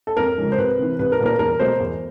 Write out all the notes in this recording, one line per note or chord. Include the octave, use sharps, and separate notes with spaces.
A4
F2 A#4
C#3 F3 G#3 C#4
C5
C2 B4
C3 E3
C2 B4
A#4
A#2 G3 B3 D4
A#4
E2 A#4
B2 F#3 A3 C5
E2